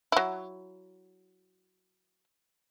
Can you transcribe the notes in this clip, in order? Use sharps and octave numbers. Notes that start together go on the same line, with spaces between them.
F#3 E4